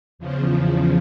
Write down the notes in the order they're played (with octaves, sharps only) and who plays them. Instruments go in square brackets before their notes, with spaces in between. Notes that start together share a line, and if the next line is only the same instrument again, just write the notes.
[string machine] E2 C#3 F3